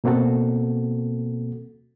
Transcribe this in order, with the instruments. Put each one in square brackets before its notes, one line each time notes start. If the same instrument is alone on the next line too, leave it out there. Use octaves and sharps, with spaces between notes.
[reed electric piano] B2 A#3 C4 F#4 A4